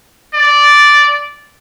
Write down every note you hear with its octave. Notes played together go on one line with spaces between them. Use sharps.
D5